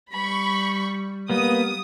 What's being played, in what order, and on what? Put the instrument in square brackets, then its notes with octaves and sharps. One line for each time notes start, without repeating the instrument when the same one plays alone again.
[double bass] G3 [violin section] B5 C#6
[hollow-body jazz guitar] G3 [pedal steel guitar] A#3 B3 [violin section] D#6